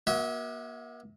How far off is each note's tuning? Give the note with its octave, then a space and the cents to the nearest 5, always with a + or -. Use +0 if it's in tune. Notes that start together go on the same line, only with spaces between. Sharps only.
A#3 +40 F#4 +0 E5 -35